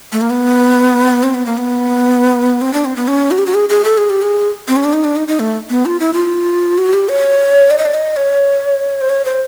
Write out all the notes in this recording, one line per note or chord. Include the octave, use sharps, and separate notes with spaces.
A3
A#3
B3
C4
B3
A#3
B3
C4
D4
C4
B3
C#4
F#4
G4
F#4
G#4
G#4
A4
G#4
G4
G#4
C4
C#4
D4
D#4
D4
D#4
D#4
A3
B3
F4
E4
F4
F#4
G4
C#5
D5
D#5
D5
D#5
C#5
C5
C#5
C5